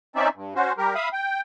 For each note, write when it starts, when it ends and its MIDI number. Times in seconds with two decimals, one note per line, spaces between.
0.16 0.28 60
0.16 0.28 61
0.16 0.28 63
0.16 0.28 74
0.16 0.28 76
0.35 0.54 43
0.55 0.73 61
0.55 0.73 66
0.55 0.73 72
0.78 0.94 55
0.78 0.94 67
0.78 0.94 70
0.95 1.09 76
0.95 1.09 77
0.95 1.09 83
0.95 1.09 87
1.13 1.41 79